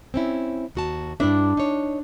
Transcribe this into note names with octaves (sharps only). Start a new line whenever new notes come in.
C4 C#4 E4
D#2 F#4 A5
G2 D4 E4 E5
D#4 C#5